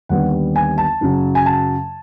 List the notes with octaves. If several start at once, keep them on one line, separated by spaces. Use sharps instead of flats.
D#2 D3 G3 B3 F#5
G#5
A5
F#2 C#3 F#3
G#5
A5